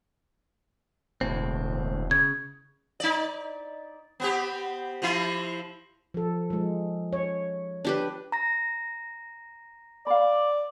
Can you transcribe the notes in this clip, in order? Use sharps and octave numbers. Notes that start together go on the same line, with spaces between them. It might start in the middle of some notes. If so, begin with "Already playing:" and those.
E1 D2 A2 C4
C#3 G#6
D#4 D5
B3 C4 G4
C3 F3 E4
F3 A4
F3 G#3
C#5
D4 G4 B4
A#5 A#6
D5 F5 B5